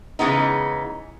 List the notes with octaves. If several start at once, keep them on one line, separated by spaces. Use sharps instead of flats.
C#3 E3 G#3 B3 D#4